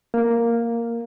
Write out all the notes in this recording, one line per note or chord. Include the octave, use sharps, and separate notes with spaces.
A#3